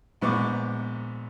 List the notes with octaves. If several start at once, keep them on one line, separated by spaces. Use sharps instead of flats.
A#1 G#2 B3 C#6 D6